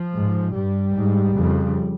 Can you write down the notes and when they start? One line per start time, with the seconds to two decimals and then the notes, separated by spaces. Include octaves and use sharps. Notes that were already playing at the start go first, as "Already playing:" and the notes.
Already playing: F3
0.14 G#2
0.54 G2 G3
0.95 G#2
1.36 F2 C#3